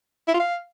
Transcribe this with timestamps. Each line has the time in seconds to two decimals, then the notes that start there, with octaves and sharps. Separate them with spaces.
0.28 E4
0.34 F4
0.40 F5